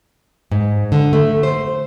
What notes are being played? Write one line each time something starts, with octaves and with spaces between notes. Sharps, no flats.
G#2
D3
A3
C5